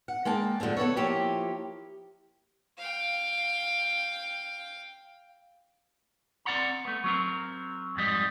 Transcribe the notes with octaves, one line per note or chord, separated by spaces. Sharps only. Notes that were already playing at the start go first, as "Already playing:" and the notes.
F#5
G#3 A#3 G5 A5
D3 F3 G#3 A3 C#4
B3 A4 B4 C#5
F3 A#3 E4 G4 C#5
F5 G5
C4 D5 F#5 A#5
A3 B3
F#3 C4 A#4
F2 G#2 G3 D#5